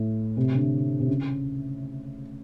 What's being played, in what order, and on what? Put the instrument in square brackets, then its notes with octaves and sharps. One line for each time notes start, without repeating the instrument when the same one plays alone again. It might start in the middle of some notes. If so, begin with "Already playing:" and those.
Already playing: [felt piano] A2
C3
D3
C3
C#3